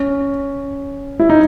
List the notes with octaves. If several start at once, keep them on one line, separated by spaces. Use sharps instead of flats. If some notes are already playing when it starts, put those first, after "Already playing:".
Already playing: C#4
E4
D#4